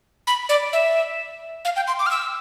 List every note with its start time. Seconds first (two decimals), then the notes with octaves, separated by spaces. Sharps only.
0.27 B5
0.49 D5
0.73 E5
1.65 F5
1.76 G5
1.87 C6
1.99 D6
2.06 F6
2.11 E6